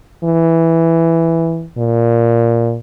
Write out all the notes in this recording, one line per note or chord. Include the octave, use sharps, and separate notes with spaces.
E3
A#2